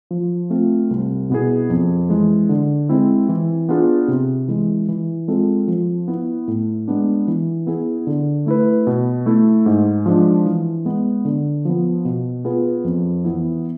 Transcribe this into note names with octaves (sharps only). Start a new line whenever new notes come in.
F3
A3 C4 F4
C2
B2 B3 E4 G#4
F2
E3 G#3
D3
G#3 C4 E4
E3
B3 D4 F4 G#4
C3
E3 G#3
E3
G#3 C4 F4 A4
F3
B3 E4
A2
G#3 B3 D4
E3
B3 E4 G#4
D3
A3 E4 B4
B2
A3 E4
G#2
F3 G#3 D4
E3
G#3 B3
D3
F3 B3
B2
B3 F4 G#4 B4
F2
E3 B3 E4